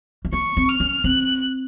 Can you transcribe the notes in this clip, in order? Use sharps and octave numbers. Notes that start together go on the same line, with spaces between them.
A3
A#3 C#6
C4
F6
C#4
C4 F#6